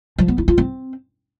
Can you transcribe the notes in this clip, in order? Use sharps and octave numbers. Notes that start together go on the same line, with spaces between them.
F3
B3
E4
F4
C4